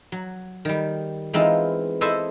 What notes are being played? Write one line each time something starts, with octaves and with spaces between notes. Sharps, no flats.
F#3
D#3 G3
E3 G#3 B3 C4 D#4 F4
E4 A4 C5 D#5 E5 A5